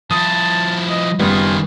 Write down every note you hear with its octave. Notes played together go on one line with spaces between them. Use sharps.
F3 E4 A5 D#6
D#5
F#1 D#3 G3 B3 F4 G#4